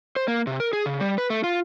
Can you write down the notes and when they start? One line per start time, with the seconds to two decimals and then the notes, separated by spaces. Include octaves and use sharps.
0.16 C5
0.28 A#3
0.47 C3
0.60 A#4
0.73 G#4
0.86 C#3
1.00 G3
1.18 B4
1.30 A3
1.44 F4